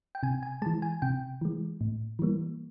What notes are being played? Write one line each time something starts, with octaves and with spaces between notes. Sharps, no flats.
G5
C3 G#5
G#5
E3 G#3 A5
G#5
C3 G5
E3 G#3
A2
E3 G3 A#3